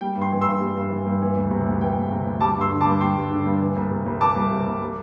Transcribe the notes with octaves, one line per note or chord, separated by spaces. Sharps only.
G3 G5
G2
G5 C6
E3
G2 C6 E6
G3
G2
E3
G2
E3
D2
C3
D2
E3 G5
D2
C3
D2
G3 A5 D6
G2 C6 E6
D3
A5 D6
G2
G3 G5 C6
G2
D3
G2
E3
C2
C3
C2
E3 A5 D6
C2
C3
C2
G3